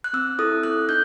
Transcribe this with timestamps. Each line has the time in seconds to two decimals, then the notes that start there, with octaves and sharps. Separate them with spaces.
0.04 F#6
0.13 C4 E6
0.39 E4 A4 D#6
0.63 C4 F#6
0.89 D#4 G6